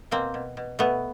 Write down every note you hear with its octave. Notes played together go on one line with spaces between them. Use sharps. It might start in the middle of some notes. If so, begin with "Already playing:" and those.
B2 A#3 C4
B2
B2
B2 A3 B3